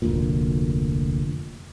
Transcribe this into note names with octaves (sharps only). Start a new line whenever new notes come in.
F1 D2 A#2